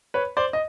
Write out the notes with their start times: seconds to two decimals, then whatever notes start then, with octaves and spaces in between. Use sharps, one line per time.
0.14 B4 C#5
0.37 C5 D5
0.53 D#5